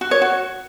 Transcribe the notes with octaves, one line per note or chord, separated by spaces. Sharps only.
F#4
C#5
F#4